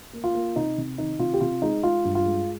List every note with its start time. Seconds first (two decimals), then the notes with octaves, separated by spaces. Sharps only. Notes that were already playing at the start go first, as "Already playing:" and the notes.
0.13 A#3
0.24 F4
0.35 A#3
0.56 C3 D#4
0.77 C3
0.98 D#3 D#4
1.19 C3 F4
1.34 G4
1.41 C3 F4
1.62 G#3 D#4
1.83 G#3 F4
2.05 G2
2.15 F4
2.26 G#3